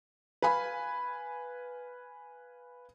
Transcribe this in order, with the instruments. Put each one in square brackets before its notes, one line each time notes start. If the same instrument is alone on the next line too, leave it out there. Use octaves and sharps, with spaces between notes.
[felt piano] B4 F5 G#5 B5